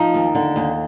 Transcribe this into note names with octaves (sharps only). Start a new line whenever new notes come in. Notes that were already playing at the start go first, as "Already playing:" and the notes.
Already playing: F3 D#4
D#2
D3
D#2